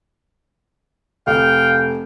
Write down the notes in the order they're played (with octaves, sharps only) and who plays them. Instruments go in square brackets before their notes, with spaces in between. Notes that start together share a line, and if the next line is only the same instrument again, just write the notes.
[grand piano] F1 [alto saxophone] F5 [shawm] G5